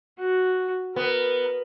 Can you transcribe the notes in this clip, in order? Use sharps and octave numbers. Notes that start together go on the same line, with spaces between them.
F#4
B3 A#4